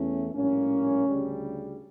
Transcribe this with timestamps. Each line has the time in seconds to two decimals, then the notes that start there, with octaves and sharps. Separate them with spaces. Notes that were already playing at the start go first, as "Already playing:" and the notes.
Already playing: E2 E3 A3 C#4
0.34 A#1 A2 G3 A#3 C#4
1.06 D2 C#3 G3